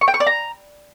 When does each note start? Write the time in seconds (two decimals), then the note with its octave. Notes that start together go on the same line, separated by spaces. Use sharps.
0.01 C#6
0.08 G5
0.14 C#6
0.20 D5
0.27 A#5